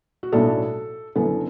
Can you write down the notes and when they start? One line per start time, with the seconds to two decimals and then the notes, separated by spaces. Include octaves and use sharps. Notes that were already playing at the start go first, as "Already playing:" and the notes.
0.23 F#4
0.32 B1 A2 F#3 D4 A4
1.15 F#1 F#2 D3 B3 E4 A4